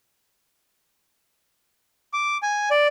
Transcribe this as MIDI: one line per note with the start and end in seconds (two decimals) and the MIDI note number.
2.13 2.37 86
2.43 2.69 80
2.71 2.87 74